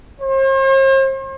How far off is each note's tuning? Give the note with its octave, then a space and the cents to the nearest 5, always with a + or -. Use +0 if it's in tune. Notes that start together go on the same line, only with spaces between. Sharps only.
C5 +45